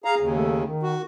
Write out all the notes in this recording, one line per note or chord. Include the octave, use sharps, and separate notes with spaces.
G#4 F5 A#5
D#2 C#3
A3
D#3
F#4